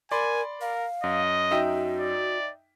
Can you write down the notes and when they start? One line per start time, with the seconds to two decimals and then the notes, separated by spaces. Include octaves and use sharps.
0.11 A#4 D5 G#5 B5 C6
0.61 A#4 F5
1.04 F#2 D#5
1.51 D#4 F#4 E5 G5
2.00 D5